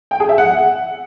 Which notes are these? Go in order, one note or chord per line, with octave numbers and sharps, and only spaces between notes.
G5
G#4
E5
F#5